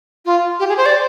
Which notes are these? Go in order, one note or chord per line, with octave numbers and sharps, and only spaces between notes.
F4
G4
G#4
C5
D5